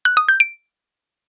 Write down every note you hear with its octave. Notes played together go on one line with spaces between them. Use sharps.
F#6
D#6
G6
D7